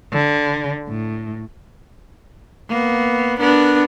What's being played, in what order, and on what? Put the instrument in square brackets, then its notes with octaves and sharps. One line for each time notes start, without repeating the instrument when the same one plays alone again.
[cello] D3
A2
[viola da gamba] A#3 B3
B3 D4 A#4